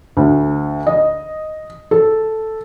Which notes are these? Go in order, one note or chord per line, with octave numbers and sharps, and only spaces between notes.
D2
D#5
A4